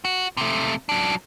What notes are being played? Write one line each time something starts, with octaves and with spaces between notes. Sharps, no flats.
F#4
C3 A3
F#3 D4